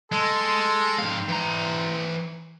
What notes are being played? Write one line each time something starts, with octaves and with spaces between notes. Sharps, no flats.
G#3 A4 C6
G#2 C4 F5
E3 A#5